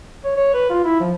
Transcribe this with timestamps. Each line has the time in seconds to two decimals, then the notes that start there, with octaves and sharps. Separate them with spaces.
0.24 C#5
0.36 C#5
0.54 B4
0.70 F4
0.84 E4
1.00 F3